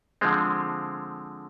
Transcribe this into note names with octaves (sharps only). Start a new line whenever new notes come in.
D3 F3 G#3 C4